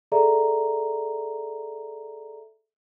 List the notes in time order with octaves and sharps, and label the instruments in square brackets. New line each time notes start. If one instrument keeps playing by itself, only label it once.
[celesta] G#4 A4 D5 E5 A#5